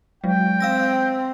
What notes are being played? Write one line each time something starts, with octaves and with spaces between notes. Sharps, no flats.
F#3 G#3 G5
C4 F5 E6 A#6